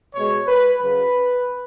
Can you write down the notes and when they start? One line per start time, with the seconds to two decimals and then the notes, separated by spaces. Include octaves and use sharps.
0.15 B2 G#3 C#5
0.48 B4
0.79 F#2 C#3 F#3 B4